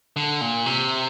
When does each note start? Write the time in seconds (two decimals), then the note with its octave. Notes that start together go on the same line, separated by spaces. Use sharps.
0.16 D3
0.41 A#2
0.66 C3